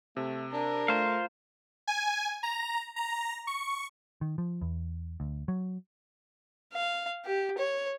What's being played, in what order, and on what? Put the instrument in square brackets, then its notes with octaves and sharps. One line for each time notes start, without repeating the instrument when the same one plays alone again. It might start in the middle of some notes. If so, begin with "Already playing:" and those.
[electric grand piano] C3 [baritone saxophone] A3
[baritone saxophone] D4 [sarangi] A#4
[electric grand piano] A3 [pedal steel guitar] F4 C5 F5
[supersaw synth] G#5
A#5
A#5
C#6
[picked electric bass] D#3
F3
E2
D2
F#3
[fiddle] F5
G4
C#5